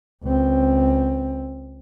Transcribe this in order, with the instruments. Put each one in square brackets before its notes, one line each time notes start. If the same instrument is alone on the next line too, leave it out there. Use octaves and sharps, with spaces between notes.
[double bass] C#2 C4